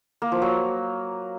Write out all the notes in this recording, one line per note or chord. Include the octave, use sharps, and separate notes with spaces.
A#3
F3
F#3